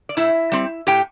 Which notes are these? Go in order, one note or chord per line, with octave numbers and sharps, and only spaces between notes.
D5
A2 E4 E5
G3 C4
A2 G4 G5